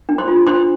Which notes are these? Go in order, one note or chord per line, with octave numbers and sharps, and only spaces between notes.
D4
C5 C6
F4
D4 C5 C6